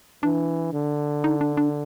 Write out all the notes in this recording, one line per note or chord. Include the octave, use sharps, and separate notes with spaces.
E3 D4
D3
D#4
D4
D4